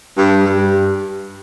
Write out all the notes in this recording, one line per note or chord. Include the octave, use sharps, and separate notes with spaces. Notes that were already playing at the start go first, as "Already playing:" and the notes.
G2
G2